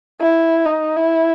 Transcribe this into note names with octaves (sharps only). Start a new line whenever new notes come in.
E4
D#4
E4